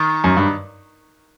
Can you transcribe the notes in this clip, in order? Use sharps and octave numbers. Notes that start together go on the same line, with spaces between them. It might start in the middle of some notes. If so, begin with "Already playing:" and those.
Already playing: D#3
F#2
G2